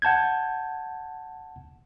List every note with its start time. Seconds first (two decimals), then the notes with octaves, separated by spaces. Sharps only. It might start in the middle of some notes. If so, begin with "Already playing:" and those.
0.02 F#5 A5 G6 G#6